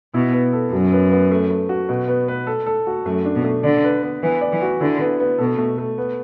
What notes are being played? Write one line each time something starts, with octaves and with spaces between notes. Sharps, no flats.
B2 E4
B3
A4
F#2 F#3
B3
B3
A3
A3
F#4
B2
B3
B4
A4
A4
F#4
F#2 A3
D4
B2
A3
D3 D5
B4
B3
E3 B3
D5
E3
F#4
D3 E4
B3
B3
B2 A4
A3
A3
B3